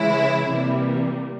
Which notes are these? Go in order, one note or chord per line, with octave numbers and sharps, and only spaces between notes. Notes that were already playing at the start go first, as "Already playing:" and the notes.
Already playing: C#3 E3 G#3 E4
C3 E3 G3 A#3